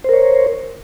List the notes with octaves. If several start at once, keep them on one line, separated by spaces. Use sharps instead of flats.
A#4 C5 C#5